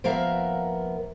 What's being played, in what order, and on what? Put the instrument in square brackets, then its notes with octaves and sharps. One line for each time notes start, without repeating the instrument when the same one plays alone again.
[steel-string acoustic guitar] F3 A#3 B3 A#4 E5 F5